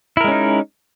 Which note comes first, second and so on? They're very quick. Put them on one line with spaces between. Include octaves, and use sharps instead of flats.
E4 A#4 G#3 C#4 D#4